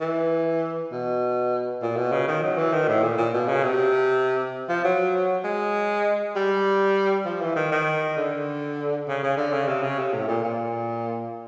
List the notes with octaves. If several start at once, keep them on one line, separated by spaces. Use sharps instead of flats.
E3
B2
A#2
B2
C#3
D#3
F#3
E3
D#3
A2
A#2
A#2
B2
C#3
C3
F3
F#3
G#3
G3
F3
E3
D#3
D#3
D3
C#3
C#3
D3
C#3
C3
C#3
C3
A2
A#2
A#2